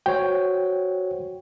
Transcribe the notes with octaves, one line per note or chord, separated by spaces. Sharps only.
F#4 C5 C#5 G5